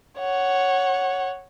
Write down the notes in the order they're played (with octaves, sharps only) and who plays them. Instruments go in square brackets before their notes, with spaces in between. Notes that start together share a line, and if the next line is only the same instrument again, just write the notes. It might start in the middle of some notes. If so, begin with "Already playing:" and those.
[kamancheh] C#5 F#5